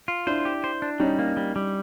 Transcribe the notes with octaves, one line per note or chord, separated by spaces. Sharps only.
F4
D4 E4 C5
G4
C5
D4
G3 C#4 D#4
A#3
G3
G3